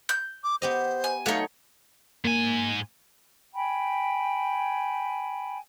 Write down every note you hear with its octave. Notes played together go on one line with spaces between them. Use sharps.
G6
D6
B3 G4 C5 D#5
G#5
F#3 A3 D#4 C#5 F5
G#2 A#3 G#5
G5 G#5 B5